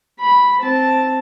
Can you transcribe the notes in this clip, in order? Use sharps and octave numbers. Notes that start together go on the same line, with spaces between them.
B5
C4 A5